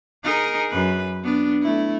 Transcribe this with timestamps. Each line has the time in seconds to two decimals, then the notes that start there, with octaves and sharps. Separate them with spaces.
0.24 D#4 G#4 A#4
0.70 F#2 B4
1.24 B3 D4
1.62 A3 E4